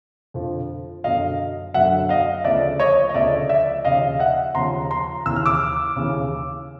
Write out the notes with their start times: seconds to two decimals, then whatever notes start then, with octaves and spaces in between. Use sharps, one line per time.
0.34 F2 D3 F3
1.04 F#2 D3 F#3 D#5 F5
1.74 F#2 D3 F#3 E5 F#5
2.09 D#5 F5
2.44 D2 C#3 F3 D5 E5
2.80 C#5 D#5
3.09 D#5
3.14 D2 C#3 F3 D5 E5
3.49 D5 E5
3.85 D#2 C#3 F3 D#5 F5
4.20 E5 F#5
4.55 D#2 C#3 F3 A#5 C6
4.91 A#5 C6
5.26 D#2 C#3 E3 E6
5.36 F6
5.46 D6 E6
5.96 D#2 C#3 E3